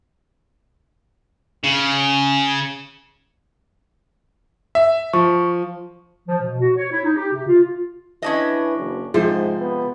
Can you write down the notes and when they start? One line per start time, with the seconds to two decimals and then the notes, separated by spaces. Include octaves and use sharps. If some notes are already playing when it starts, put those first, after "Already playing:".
1.64 C#3
4.75 E5
5.13 F3 C#6
6.28 F3
6.42 B2
6.61 F#4
6.77 C#5
6.91 E4
7.05 D#4
7.16 G4
7.32 C3
7.47 F4
8.22 E3 C#4 D4 D#5
8.77 F#1
9.14 G#2 C3 F3 G#3 C5
9.60 B3